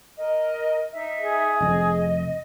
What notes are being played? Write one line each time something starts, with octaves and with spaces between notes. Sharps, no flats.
A#4 D#5
D#4 E5
G#4
F1 F2 D#5